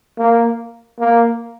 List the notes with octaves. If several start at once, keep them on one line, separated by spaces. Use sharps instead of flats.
A#3
A#3